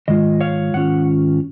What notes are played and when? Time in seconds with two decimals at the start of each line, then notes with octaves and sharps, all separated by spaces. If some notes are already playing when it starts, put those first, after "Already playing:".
0.08 G#2 D#3 G#3 F4 D#5
0.40 C#5 F5
0.73 G#2 D#3 C#4 F4 F#5